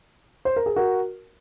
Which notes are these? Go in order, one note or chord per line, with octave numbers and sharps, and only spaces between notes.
C5
A#4
G#4
F#4 A#4